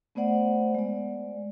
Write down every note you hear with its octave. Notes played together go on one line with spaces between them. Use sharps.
A3 B3 C5 D5 F#5
G#3 D5